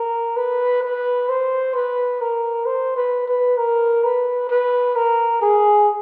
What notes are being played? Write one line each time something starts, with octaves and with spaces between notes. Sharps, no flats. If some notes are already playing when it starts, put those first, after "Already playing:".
Already playing: A#4
B4
B4
C5
B4
A#4
C5
B4
B4
A#4
B4
B4
A#4
G#4